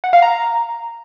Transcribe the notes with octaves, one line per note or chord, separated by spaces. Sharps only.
F#5
F5
A#5